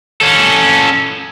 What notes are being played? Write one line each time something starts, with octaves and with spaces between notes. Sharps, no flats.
C#4 A4